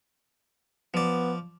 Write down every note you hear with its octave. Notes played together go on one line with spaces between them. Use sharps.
F3 B3 D5